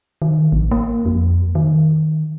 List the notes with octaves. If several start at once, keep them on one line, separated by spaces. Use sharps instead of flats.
D#3
A1
A#3
F2
D#3